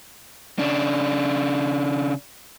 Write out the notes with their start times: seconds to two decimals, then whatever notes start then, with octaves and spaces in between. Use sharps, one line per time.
0.59 C#3 D4